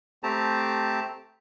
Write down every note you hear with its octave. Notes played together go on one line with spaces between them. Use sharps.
A3 C4 G4 A5 A#5